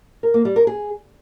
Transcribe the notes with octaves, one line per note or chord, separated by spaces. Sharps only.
A#4
A#3
G3
A#4
G#4